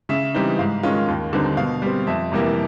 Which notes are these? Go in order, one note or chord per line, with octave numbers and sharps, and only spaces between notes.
C#3 E5
E3 G3 C4 D#4
G#2 F5
D#3 G#3 C#4 F4
D#2
D3 G3 C4 D#4
B2 F5
G3 C4
F2 E5
C3 E3 G3 A#3